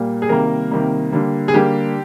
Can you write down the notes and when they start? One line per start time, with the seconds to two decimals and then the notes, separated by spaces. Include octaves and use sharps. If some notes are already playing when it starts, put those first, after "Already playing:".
Already playing: A#2 G3 A#3
0.22 G#4
0.29 C3 D#3 G3 A#3 A#4
0.71 C3 D#3 G3 A#3
1.12 D3 G3 A#3
1.48 G#4
1.54 D3 G3 A#3 G4